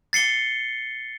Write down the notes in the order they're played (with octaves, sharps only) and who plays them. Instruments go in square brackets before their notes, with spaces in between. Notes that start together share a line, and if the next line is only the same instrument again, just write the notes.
[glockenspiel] A6 C7 C#7 G7